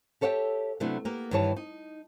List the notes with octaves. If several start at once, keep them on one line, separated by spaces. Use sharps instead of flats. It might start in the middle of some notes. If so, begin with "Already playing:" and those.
G4 A4 C#5 E5 F5 G5
C3 F#3 A3 B3 D4 E4
A#3 B3 G4 A#4
G2 D#3 E3 G4 C#5 A5
D#4